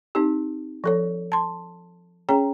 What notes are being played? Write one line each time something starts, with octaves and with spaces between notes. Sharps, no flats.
C4 D#4 G4
F3 A4 C#5
A5 C6
C#4 G#4 C#5 G5 A#5